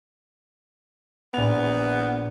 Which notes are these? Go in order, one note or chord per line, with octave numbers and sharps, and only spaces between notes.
A#1 B3 F7